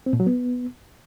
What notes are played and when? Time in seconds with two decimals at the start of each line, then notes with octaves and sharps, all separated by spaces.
0.06 C4
0.13 A#2
0.20 F#3
0.26 B3